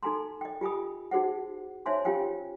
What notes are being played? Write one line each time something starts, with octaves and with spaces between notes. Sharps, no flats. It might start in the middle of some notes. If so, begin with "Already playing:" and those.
D#4 A4 G#5 A#5 C6
D#5 G5
F4 G4 G#5 B5 D#6
D#4 F#4 G#4 C5 F#5
D#4 C5 C#5 E5 G#5 C6
C#4 F4 G4 F5 G5 G#5